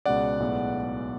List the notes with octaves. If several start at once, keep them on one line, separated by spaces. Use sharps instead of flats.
C#2 B2 G#3 C#4 D5 F#5
B1 A2 G#3 B3